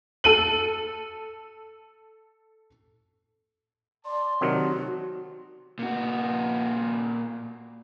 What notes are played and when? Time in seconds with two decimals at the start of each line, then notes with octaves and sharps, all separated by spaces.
0.24 A4 D#7 F#7
4.05 D5 A5 C6
4.41 C3 D#3 F#3 F#4
5.79 A#2 F#4